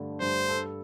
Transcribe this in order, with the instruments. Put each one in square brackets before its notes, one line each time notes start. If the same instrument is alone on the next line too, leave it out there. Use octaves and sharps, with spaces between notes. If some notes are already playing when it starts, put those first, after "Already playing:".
Already playing: [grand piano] G2 D3 A3
[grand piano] G2 [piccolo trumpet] C5
[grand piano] A4